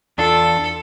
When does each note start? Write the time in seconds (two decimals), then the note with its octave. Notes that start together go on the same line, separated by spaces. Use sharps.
0.18 E2 D4 F4 A4